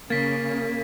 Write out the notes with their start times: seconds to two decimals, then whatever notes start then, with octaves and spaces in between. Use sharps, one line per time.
0.10 C#3 A#3 A6 B6